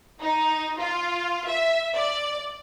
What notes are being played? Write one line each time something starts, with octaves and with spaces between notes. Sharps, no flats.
D#4
F4
E5
D5